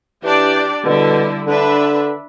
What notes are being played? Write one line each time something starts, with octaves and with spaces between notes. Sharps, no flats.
E3 D4 G4 D5
B2 D3 G3 E4
D3 D4 B4 E5